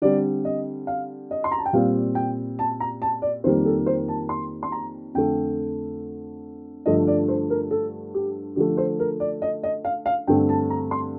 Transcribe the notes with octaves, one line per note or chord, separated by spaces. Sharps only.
D3 G3 C4 D5
D#5
F5
D#5
C6
A#5
A5
G5
A#2 G3 C4 F5
G5
A5
A#5
A5
D5
F2 D#3 G3 A#3 C5
A4
C5
A5
C6
C6
A#5
F2 D3 A3 G5
G2 D3 F3 A3 D#5
D5
C5
A#4
A4
G4
D3 F3 A3 G4
C5
A#4
D5
D#5
D#5
F5
F5
G2 D3 A3 C4 G5
A5
A#5
C6